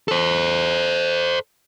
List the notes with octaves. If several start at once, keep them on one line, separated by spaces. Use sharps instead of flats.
A4 C5